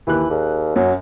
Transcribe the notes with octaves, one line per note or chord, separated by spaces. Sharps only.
D#2 E3 G4 F#6
D#2 G#4
F#2 F#3